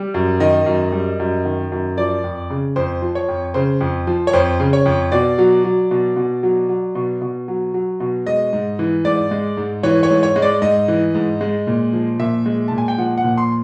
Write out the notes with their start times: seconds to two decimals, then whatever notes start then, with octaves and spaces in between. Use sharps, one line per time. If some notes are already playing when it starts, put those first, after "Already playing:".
Already playing: G3
0.14 F#2
0.40 D#3 D#5
0.66 F#2
0.92 G3
1.20 F#2
1.45 D#3
1.72 F#2
1.97 F3 D5
2.24 F2
2.50 C#3
2.76 F2 C5
3.02 F3
3.15 C#5
3.28 F2
3.54 C#3 C5
3.81 F2
4.07 F3
4.27 C#5
4.33 F2 C5
4.60 C#3
4.73 C#5
4.86 F2
5.12 B2 D5
5.38 F#3
5.64 F#3
5.91 B2
6.16 B2
6.43 F#3
6.69 F#3
6.95 B2
7.22 B2
7.48 F#3
7.74 F#3
8.00 B2
8.26 G#3 D#5
8.53 G#2
8.79 E3
9.05 G#2 D5
9.31 G#3
9.57 G#2
9.83 E3 C#5
10.03 C#5
10.10 G#2
10.23 C#5
10.36 G#3
10.42 D5
10.62 G#2 D#5
10.88 E3
11.15 G#2
11.41 G#3
11.67 A#2
11.93 F3
12.19 A#2 E5
12.46 G#3
12.68 A#2 A5
12.78 G#5
12.88 G5
12.98 F3 F#5
13.18 F#5
13.24 A#2
13.38 C6